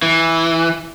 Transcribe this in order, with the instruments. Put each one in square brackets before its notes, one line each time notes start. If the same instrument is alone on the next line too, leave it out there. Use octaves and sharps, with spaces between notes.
[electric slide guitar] E3